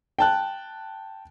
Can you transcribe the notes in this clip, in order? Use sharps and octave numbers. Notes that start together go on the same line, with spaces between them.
G5 A5 F#6